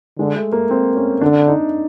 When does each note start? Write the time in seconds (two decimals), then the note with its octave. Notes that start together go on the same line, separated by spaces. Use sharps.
0.18 D3 G#3
0.36 A3
0.52 A#3
0.70 C4
0.95 C#4
1.21 D3 D4
1.48 D#4